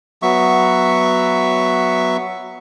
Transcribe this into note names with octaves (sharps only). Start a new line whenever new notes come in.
F#3 B3 E5 C#6